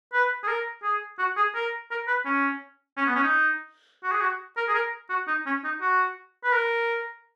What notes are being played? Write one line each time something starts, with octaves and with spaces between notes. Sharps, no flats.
B4
G#4
A#4
G#4
F#4
G#4
A#4
A#4
B4
C#4
C#4
B3
C#4
D#4
F#4
G#4
F#4
A#4
G#4
A#4
F#4
D#4
C#4
D#4
F#4
B4
A#4